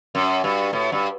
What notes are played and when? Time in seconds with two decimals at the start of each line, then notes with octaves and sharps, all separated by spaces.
0.15 F#2
0.44 G2
0.73 A2
0.92 G2